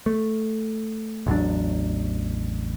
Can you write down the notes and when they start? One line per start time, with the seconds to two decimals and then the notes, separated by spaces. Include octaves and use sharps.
0.06 A3
1.27 A1 E2 F#3 D4